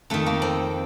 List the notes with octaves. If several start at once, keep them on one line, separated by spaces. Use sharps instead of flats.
F2 D#3 A3
A#3
C4